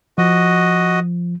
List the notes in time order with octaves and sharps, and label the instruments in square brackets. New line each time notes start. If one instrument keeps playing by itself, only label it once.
[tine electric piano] F3 [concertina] F#4 D#5